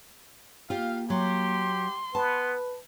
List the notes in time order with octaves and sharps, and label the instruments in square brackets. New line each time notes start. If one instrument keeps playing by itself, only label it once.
[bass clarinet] A#3 [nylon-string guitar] F4 G4 [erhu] F5
[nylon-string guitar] F#3 [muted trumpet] G4 [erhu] C6
[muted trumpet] B3 [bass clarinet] B4 [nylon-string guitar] A5